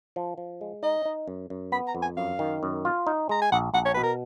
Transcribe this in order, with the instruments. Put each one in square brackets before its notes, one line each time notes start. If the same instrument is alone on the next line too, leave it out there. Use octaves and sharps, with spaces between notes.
[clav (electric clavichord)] F3
F3
G#3
[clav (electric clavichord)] D#4 [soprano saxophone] D#5
[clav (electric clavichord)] D#4
F#2
F#2
[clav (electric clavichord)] B3 [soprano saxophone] B5
[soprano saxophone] A#5
[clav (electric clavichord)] F2
[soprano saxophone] G#5
[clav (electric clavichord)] F#2 [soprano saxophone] F5
[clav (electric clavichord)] D#3
F#2
F4
D#4
[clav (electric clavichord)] G#3 [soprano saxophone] A#5
[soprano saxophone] G#5
[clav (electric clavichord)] A#1 [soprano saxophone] F#5
[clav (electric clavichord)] A#1 [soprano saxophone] F#5
[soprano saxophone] C#5
[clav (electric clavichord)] B2 [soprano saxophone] B4
[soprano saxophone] A#4